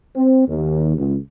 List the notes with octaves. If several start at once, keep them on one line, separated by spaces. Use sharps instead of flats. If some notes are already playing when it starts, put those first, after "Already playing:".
C4
D#2
C#2